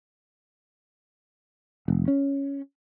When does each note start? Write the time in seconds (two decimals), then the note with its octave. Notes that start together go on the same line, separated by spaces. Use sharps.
1.88 F1
2.08 C#4